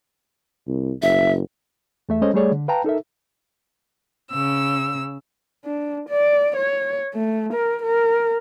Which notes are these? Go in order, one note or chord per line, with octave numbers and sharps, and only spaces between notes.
C2
F#1 E5
E2 A3 E5
G#3 C#4 A4 C5 C#5 D#5
G3 A3 G#4 C#5 D5
D3
B4 F5 G5 A5 A#5
D#4 A4 A#4 E5
C#3 E6
D4
D5
C#5
A3
A#4
A#4